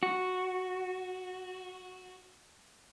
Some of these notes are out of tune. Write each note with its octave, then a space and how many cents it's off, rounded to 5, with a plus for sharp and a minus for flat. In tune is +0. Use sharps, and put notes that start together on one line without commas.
F#4 -5